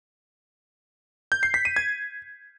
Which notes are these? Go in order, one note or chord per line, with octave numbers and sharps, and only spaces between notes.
G6
C7
B6
D#7
G#6